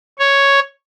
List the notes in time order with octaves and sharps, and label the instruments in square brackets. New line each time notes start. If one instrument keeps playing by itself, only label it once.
[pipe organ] C#5